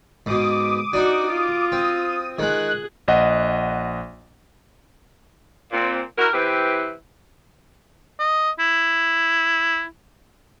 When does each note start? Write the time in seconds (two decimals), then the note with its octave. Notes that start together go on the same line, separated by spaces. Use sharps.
0.26 G#2 B2 D6 D#6
0.93 D4 D#4 F#4
1.30 F4
1.72 C4 D#6
2.39 D#3 G#3 G#4 F#6
3.08 A#1 D#5 F#5
5.72 A#2 C4
6.18 E4 F#4 A#4
6.33 E3 C4 E4 G4 B4
8.19 D#5
8.59 E4